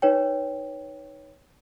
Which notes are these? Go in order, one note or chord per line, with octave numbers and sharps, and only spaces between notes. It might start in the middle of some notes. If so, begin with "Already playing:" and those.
D#4 B4 C#5 G5